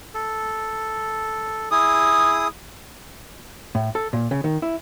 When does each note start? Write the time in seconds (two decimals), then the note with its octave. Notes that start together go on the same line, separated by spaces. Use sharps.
0.14 A4
1.71 E4 G#4 D#6
3.75 A2
3.95 A4
4.13 A#2
4.31 C#3
4.44 D#3
4.62 E4